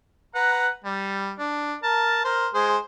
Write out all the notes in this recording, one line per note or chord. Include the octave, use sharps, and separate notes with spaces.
B4 F#5 A#5
G3
D4
A#4 A5
A#4 C5
G#3 G#4 C5